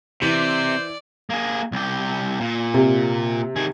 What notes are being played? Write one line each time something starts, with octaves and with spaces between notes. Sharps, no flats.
C3 E3 C5 D5
A#3 G#4
C2 G4
A#2
C3
D#3 G#4